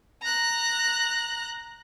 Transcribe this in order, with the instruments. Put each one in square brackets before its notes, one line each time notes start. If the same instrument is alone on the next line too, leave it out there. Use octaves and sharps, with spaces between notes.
[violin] A#5 F#6